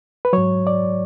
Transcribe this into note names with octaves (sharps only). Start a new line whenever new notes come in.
B4
G#2 F#3 C#5
D5